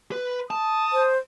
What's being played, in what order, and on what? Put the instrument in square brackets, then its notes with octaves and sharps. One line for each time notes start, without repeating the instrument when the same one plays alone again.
[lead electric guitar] B4
[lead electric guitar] A5 [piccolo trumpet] D#6
[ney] C5